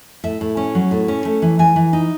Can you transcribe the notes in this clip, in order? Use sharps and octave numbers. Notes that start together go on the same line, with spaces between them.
A2 E5
A2
C#4
F#3
A2
C#4
A3
E3
E3 G#5
E3
D#4